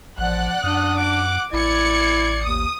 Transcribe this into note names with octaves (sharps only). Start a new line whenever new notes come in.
A1 F3 D5 F#5 F#6
F#2 D4 D#6
F#5 D6
A1 E4 D5 G#6 C#7
D#2 D#6